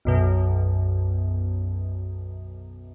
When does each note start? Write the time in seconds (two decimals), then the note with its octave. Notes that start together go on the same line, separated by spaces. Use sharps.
0.05 B1 F#2 B2